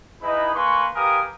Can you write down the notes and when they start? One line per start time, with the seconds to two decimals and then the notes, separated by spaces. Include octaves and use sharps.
0.22 D#4 E4 G#4 B4 D#5 B5
0.54 A#3 B4 G#5 C6 C#6
0.95 G4 A#4 B4 F5 G#5 D#6